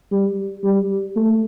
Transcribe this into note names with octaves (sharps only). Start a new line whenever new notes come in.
G3
G3
A3